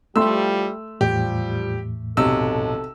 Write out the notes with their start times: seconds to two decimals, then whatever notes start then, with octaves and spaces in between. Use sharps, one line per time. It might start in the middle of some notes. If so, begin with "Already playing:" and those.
0.16 A2 F3 G3 A3 C6 E6
1.01 E2 A2 F3 G3 G4
2.17 B1 C3 A4 E6